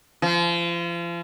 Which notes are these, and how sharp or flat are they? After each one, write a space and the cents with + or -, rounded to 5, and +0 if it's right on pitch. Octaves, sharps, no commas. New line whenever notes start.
F3 -35